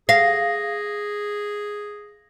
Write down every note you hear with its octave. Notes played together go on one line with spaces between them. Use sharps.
G#4 F5 A#6